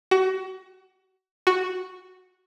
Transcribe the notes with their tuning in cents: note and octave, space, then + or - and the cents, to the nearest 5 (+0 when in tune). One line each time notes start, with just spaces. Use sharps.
F#4 +30
F#4 -5